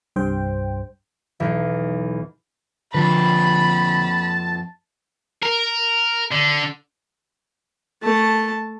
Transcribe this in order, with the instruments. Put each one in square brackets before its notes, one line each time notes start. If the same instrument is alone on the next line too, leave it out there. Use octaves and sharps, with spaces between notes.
[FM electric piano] C2 G2 C5 G5
[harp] B1 E2 D#4 E4 G6
[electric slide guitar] F2 B4 [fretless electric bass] D3 F3 [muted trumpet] A5 [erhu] B5
[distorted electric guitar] A#4
D3
[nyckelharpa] A3 A5